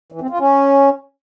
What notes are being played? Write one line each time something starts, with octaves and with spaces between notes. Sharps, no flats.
E3
C4
F4
C#4